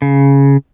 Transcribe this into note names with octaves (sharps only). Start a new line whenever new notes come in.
C#3